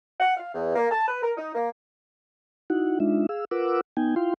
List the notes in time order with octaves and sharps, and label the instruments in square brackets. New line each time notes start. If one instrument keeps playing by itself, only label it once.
[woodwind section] F#5
F5
E2
A#3
A5
B4
A#4
D#4
A#3
[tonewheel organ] D#4 E4 F#4 F#5
G#3 D4 D#4 F4 E5
G#4 F5 E6
F4 A#4 B4 F#5 D6 E6
B3 D#4 G5 G#5
E4 F4 F5 G5 C6